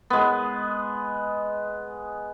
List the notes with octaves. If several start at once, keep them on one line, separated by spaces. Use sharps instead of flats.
G#3 B3